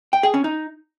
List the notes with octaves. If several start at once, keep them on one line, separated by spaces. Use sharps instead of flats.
G5
G#4
C#4
D#4